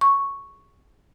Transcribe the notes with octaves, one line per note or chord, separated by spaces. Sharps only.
C#6